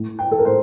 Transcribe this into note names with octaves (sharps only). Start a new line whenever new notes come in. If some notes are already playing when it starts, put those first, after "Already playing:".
Already playing: A2
G5
A4
A#4
A2 C5